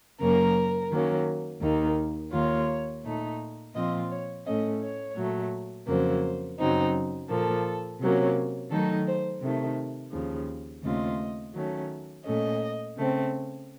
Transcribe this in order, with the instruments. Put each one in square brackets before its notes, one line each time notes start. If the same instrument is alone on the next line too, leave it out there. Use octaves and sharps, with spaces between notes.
[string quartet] F#2 C#3 F#3 A#3 C#4 A#4
D#3 F#3 A#3 C#4
D#2 D#3 A#3 D#4
D#2 D#3 A#3 F4 C#5
A#2 A3 D#4
A#2 F3 C4 F4 D#5
C#5
A2 A3 C#4 D#5
C#5
A#2 F#3 A3
F2 C#3 F#3 A#3 C5
F#2 C#3 F#3 C4 D#4
A#2 F3 A#3 A4
C3 F#3 A#3 C#4
D#3 F#3 A3 D#4 A4
C5
C3 D#3 A3
D#2 C#3 F3
D#2 C#3 A3 C4 F4 D#5
D#3 F#3 A3 C#4
A#2 A3 C#4 D#5
C#3 A3 C4